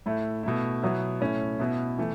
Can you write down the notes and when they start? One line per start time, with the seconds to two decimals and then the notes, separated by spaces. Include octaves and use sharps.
0.06 A2 A3 E4
0.43 B2 A3 E4
0.82 B2 F#3 B3 E4
1.20 A2 A3 C#4 E4
1.59 B2 B3 E4
1.98 E3 A3